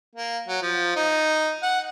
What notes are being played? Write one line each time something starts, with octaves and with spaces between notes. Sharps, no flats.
A#3
F#3
F3
D#4
F#5